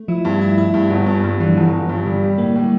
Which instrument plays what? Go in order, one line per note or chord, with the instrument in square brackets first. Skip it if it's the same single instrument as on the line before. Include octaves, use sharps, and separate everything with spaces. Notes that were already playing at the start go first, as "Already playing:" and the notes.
Already playing: [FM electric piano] A3
[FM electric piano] F3 [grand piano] E4
[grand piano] G2
E4
E4
G2
G1
G2
G2
[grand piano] D3 [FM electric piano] E3
[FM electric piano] F3
[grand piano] G1 [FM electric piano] E3
[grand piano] G1
G2
[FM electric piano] D3 [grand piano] G3
[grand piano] G3
[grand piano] A2 [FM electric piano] A#3
[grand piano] A2
[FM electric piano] G3